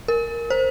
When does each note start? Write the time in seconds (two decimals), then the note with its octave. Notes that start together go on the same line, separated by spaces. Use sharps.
0.08 A#4
0.50 C5